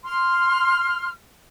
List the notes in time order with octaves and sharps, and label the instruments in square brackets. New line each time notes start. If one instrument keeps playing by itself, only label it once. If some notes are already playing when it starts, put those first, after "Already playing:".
[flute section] C6 F6